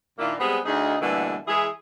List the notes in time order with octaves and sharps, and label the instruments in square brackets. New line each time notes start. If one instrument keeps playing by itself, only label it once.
[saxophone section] A#2 D#3 A#3 D4 E4 F4
G3 G#3 B3 C4 G#4
D2 D#4 G#4
B2 D3 E3 G3 A3 A#3
E3 G#3 E4 G#4